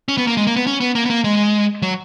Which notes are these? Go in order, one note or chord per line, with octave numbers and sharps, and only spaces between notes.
C#4
B3
A#3
G#3
A#3
B3
C#4
B3
A#3
B3
A#3
G#3
F#3